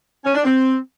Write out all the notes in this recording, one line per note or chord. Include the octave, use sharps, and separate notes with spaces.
C#4
D4
C4